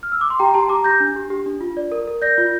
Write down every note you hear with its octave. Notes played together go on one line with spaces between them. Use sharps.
F6
E6
D6
C6
G4 G5 A#5
G4 A5 C6
G4 A#5 D6
G4 G6 A#6
D4
G4
G4
D4
F4
D5
A#4
A#4
D5 G6 A#6
F4